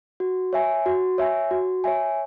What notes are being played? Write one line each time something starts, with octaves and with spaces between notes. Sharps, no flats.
F#4
C#5 E5 G#5
F#4
C#5 E5 G#5
F#4
C#5 E5 G#5